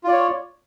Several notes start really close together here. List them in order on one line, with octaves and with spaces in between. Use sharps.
F4 D5 C#5